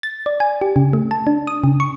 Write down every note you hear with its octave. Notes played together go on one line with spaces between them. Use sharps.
A6
D5
G#5
G4
C#3
A3
A5
D4
D#6
C#3
C#6